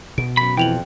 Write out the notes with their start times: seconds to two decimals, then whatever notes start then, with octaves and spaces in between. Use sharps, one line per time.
0.18 B2 D7
0.37 F#2 B5
0.57 F2 E3 G5 F7 F#7